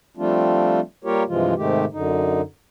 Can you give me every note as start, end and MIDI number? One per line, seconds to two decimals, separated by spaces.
0.17 0.80 53
0.17 0.80 55
0.17 0.80 57
0.17 0.80 60
0.17 0.80 62
0.17 0.80 65
1.04 1.23 55
1.04 1.23 58
1.04 1.23 65
1.04 1.23 67
1.04 1.23 70
1.04 1.23 73
1.28 1.54 43
1.28 1.54 48
1.28 1.54 52
1.28 1.54 53
1.28 1.54 56
1.28 1.54 65
1.56 1.85 44
1.56 1.85 48
1.56 1.85 51
1.56 1.85 56
1.56 1.85 57
1.56 1.85 67
1.92 2.41 42
1.92 2.41 50
1.92 2.41 63